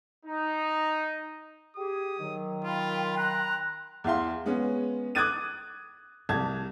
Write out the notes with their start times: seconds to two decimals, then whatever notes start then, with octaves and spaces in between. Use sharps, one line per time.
0.25 D#4
1.76 G4 G#4 D#6
2.20 D#3 F#3
2.64 F4 G5 B5 C6
3.17 A#5 F#6
4.04 E2 E4 F5 C6
4.46 G#3 B3 C#4
5.15 D6 D#6 F#6 G#6 A6 D#7
6.29 C2 A5 G#6